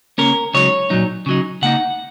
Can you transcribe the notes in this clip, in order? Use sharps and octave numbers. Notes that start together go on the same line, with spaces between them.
C#3 A#3 C#4 A#4
C#2 C#3 F#3 D#4 C#5
A#2 F#3 D#4
C#3 F#3 D#4
C#3 A#3 D#4 F#5